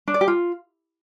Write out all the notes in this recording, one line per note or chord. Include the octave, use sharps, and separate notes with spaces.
D4
D5
G4
F4